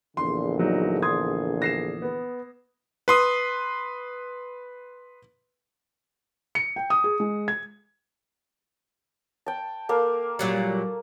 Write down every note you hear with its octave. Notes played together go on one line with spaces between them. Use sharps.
A#1 E2 D3 C6
F#3 D#4
C6 D#6 G#6
A#6 C7 E7
B3
B4 C6 D#6
C#7
G5
D#6
G#4
G#3
G#6
G5 A5
A#3 A4 F5
A#2 F#3 G3